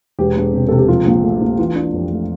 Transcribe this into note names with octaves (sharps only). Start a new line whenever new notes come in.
E1 G4
E1
C3
C3 A4
G4
F3 F4
A#1
A3
A#1
E3 F4
D4
F2
A3